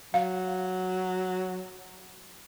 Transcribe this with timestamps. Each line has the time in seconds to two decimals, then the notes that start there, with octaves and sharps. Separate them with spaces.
0.14 F#3 F5